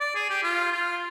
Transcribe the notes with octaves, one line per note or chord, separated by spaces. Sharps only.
D5
G#4
G4
F4
F4